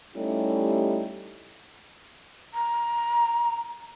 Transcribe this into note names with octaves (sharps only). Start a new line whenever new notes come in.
G3 A3 C#4 D#4 E4 G4
A#5